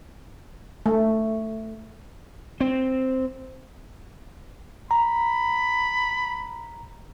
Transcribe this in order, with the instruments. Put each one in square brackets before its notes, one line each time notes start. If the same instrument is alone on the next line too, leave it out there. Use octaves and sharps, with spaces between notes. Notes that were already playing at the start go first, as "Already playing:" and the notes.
[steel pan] A3
[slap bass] C4
[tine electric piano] A#5 [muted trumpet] B5